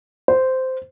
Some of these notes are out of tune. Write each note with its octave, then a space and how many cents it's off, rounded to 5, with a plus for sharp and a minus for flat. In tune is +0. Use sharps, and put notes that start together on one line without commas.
C5 -10